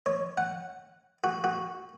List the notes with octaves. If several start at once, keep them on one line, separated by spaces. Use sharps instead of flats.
C#5
F#5
F#4
F#4